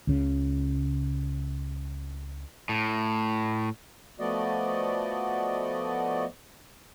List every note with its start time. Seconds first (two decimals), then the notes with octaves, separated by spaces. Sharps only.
0.07 C#2 C#3
2.69 A2
4.20 F3 A3 B3 F#4 D5 D#5